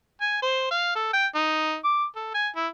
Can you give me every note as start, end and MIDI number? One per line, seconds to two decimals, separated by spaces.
0.21 0.37 80
0.42 0.70 72
0.71 0.93 77
0.95 1.09 69
1.13 1.27 79
1.35 1.76 63
1.84 2.05 86
2.16 2.31 69
2.34 2.49 80
2.56 2.67 64